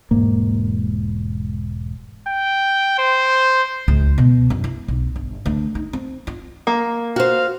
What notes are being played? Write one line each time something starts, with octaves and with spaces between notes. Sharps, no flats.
E1 G#2 A#3
G5
C5
C#2
B2
F#2
E4
B1
G1
D2
D#4
C4
F4
A#3
F#4 C5 F5